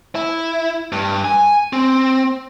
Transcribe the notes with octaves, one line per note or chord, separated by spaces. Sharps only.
E4
G2
G#5
C4